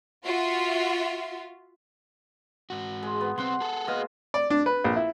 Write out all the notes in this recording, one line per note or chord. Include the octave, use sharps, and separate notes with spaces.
F4 F#4 E5 C6
G#2 F#4
G#3
B3
B1 C4 F#5 C6
G#4 A4
B2 G#3 A#3 D#5 F5
D5
D4
B4
A#1
E4